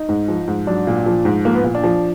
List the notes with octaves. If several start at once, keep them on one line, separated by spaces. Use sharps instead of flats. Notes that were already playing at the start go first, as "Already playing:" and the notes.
Already playing: D#4
G#2
F3
G#2
F#3 D4
A#2
F3
G#2
F3 A#3
B3
A#2
D4
F3